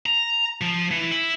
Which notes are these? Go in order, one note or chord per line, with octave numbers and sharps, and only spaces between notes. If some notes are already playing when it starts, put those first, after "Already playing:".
A#5
F3
E3
E4